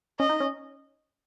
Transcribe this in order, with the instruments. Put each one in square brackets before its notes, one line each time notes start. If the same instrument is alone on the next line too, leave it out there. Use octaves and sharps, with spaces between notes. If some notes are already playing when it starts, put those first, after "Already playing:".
[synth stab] C#4 [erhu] D#5
[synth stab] D#4
C#4